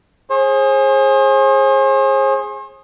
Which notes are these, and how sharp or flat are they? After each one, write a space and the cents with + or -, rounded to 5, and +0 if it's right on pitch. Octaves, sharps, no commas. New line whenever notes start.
G#4 +0 C5 +45